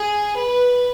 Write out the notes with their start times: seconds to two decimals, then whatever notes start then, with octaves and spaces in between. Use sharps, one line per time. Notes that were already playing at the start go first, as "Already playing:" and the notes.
Already playing: G#4
0.36 B4